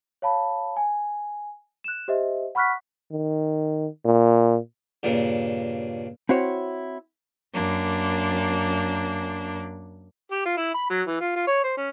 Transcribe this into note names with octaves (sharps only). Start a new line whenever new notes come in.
C#5 F5 A5 B5
G#5
F#6 E7
G4 C5 D#5 E5
F#5 B5 C#6 F6 F#6 B6
D#3
A#2
G2 A#2 C#3
C4 E4 F#4 C5 C#5
F#2 A#3 D4
G4
F4
E4
B5
F#3
E3
F4
F4
C#5
C5
C#4